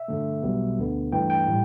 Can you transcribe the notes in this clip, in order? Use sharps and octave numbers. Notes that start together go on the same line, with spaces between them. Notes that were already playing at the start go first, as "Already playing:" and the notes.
Already playing: E5
G2 D3 A3
B1 B2 G3 B3
D2 D3 B3
G2 E3 A3 G5
G5
A2 G3